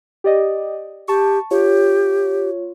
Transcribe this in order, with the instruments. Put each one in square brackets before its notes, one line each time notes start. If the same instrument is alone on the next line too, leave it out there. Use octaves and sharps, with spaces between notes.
[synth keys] G4 D5 D#5
[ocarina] G4 [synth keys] A5 C#6
[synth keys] F4 C#5 [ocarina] G4